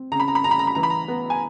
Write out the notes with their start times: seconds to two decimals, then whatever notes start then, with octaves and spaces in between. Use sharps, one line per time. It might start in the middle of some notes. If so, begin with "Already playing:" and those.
Already playing: C4
0.12 C#3 A#5
0.20 B5
0.28 A#5
0.35 B5
0.44 C#3 A#5
0.51 B5
0.59 A#5
0.67 B5
0.75 E3 A#5
0.83 B5
0.90 A#5
1.08 B3
1.30 G#5